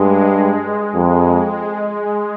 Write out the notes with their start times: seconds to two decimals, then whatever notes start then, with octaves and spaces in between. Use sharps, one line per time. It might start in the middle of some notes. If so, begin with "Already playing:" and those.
Already playing: G2 G#3
0.95 F2 G#3